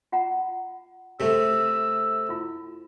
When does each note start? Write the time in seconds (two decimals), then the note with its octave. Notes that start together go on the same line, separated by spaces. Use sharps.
0.12 F4 F#5 A#5
1.20 C3 A3 E6
2.29 E4 F4